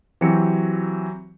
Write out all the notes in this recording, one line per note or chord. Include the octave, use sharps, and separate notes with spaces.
E3 F#3 C4 F#4 G4 C#7